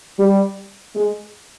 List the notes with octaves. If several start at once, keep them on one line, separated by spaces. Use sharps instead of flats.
G3
G#3